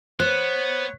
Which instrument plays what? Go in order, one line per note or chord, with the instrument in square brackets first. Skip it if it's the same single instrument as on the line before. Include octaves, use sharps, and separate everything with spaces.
[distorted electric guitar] B3 [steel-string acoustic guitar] C5 [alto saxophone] C#5 [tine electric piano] F#6